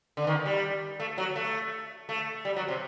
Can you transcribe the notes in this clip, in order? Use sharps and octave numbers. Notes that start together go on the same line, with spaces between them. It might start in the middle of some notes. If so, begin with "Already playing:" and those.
D3
D#3
G3
A3
F#3
A3
A3
G3
F#3
C3